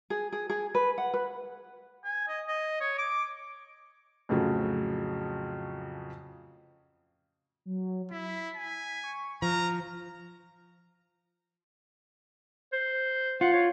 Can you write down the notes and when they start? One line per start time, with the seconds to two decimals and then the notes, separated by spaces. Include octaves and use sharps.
0.10 G#4
0.32 G#4
0.50 G#4
0.75 B4
0.98 F#5
1.14 B4
2.05 G#5
2.28 D#5
2.48 D#5
2.81 C#5
2.98 D6
4.29 F2 A2 C#3 F3 F#3
7.65 F#3
8.11 E4 B6
8.56 G#5
9.04 C#6
9.42 F3 A#5 F6
12.73 C5
13.41 F4 F#5
13.53 C#5